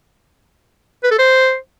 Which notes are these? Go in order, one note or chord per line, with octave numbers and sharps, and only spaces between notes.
B4
A4
C5